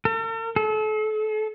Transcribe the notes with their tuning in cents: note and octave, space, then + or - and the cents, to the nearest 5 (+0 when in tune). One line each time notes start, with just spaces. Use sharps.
A4 +45
A4 -35